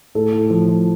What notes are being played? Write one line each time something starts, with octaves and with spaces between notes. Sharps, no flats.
A2 A4
A2
F3
F3